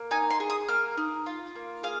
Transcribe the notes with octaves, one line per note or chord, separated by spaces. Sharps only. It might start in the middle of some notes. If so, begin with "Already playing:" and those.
Already playing: A#3
D#4 G#5
C6
G#4
D#6
A#3 F6
D#4
F4
A#3
G#4 F5